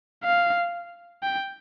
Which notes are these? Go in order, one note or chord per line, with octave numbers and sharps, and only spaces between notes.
F5
G5